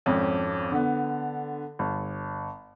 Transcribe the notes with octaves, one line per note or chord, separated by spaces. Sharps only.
G#1 F2 C#4
D3 B3
G1